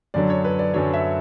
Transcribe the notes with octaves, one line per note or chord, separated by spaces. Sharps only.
F#2 D3 F#3 D5
C#5
B4
D5
F#2 D3 F#3 C#5
E5